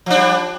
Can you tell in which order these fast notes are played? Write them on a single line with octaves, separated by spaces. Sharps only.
F3 D4 G3